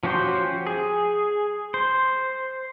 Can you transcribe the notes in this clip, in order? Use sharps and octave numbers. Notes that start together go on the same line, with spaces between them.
F3 C#4 F#4 G4 C5
G#4
C5